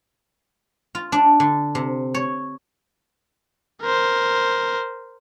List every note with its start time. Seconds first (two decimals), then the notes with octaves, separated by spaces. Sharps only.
0.95 F4
1.12 D4
1.40 D3
1.75 C3
2.14 C#5
3.82 A#4 C5